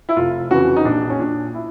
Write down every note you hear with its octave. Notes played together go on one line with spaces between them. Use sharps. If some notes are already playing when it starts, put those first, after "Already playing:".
E4
F1 F4
F2 C#3 E3 F#4
D#4
A#1 D4
C#4
A#2 D4
E4